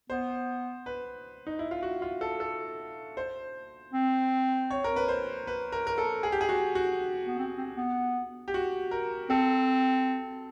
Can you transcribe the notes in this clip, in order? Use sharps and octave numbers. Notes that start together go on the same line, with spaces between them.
B3 C5
B4
D#4
E4
F4
F#4
F4
A4
A4
C5
C4
C#5
A#4
B4
C5
B4
A#4
A#4
A4
G#4
G4
G#4
F#4
F#4
B3
C4
C4
B3
G4
F#4
A#4
C4 A4